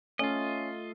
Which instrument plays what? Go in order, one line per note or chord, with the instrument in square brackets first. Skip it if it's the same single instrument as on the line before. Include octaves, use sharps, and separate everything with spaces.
[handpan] A3 A4 F5 [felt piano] C#4 [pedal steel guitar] F4 D#5